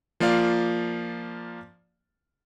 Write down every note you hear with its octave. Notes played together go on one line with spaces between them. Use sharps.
F3 A#3 F4 D5 F5